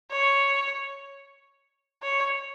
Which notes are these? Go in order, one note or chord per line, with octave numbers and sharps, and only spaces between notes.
C#5
C#5